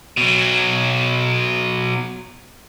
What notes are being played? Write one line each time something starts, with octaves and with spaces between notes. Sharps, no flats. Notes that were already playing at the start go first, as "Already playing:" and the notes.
B2 F#3